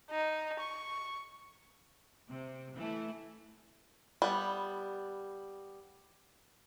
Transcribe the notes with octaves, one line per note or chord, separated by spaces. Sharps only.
D#4
C#6
C3
E3 A3 E4
G3 B3